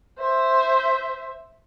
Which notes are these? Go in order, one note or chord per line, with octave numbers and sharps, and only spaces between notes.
C5 E5